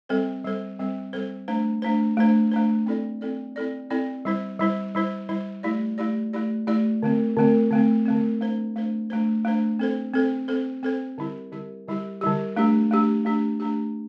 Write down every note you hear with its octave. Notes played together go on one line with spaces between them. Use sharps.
G3 C4 A4 C5
G3 C4 A4 C5
G3 C4 A4 C5
G3 C4 A4 C5
A3 D4 C5
A3 D4 C5
A3 D4 C5
A3 D4 C5
C4 E4 A4 D5
C4 E4 A4 D5
C4 E4 A4 D5
C4 E4 A4 D5
G3 E4 C5
G3 E4 C5
G3 E4 C5
G3 E4 C5
A3 E4 G4 D5
A3 E4 G4 D5
A3 E4 G4 D5
A3 E4 G4 D5
D3 A3 C4
D3 A3 C4
D3 A3 C4
D3 A3 C4
A3 D4 C5
A3 D4 C5
A3 D4 C5
A3 D4 C5
C4 A4 C5
C4 A4 C5
C4 A4 C5
C4 A4 C5
D3 G3 E4 G4
D3 G3 E4 G4
D3 G3 E4 G4
D3 G3 E4 G4
A3 D4 G4
A3 D4 G4
A3 D4 G4
A3 D4 G4